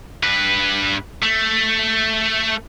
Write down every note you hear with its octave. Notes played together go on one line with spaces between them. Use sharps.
G2 B4
A3